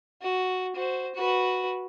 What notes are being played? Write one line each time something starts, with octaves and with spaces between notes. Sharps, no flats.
F#4
F#4 C5
F#4 B4